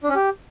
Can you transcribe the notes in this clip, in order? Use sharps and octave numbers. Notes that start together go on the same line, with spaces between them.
D4
C#4
G4